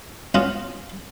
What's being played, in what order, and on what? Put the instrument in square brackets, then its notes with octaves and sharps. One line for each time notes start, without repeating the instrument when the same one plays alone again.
[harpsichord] B3 C#4 F4 F#4